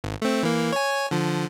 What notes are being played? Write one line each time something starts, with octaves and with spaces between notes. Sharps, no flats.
G#1
A3 C4
E3 A#3
C#5 G#5
D3 F3